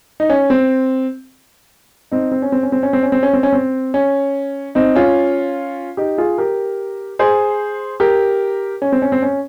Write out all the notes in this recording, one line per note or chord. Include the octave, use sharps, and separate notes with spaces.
D#4
C#4
C4
C4 D#4
C4
C#4
C4
C#4
C4
C#4
C4
C#4
C4
C#4
C4
C#4
C4
C#4
C4 D#4
C#4 F4
D#4 G4
F4 G#4
G4 A#4
G#4 C5
G4 A#4
C#4
C4
C#4
C4
C#4